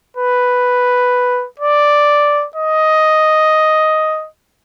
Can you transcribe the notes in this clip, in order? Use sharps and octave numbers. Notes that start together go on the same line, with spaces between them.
B4
D5
D#5